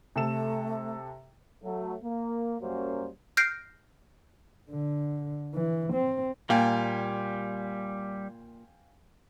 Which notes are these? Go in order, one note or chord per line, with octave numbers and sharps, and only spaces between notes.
C3 A3 A4 E7
F#3 A3
A#3
F#2 F#3 G3 A#3 C#4 C5
F6 G6 A#6 C7 D7
D3
E3
C4
A#2 G3 F5 G5 G#5